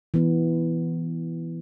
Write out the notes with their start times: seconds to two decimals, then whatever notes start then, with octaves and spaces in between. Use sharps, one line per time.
0.14 E3 B3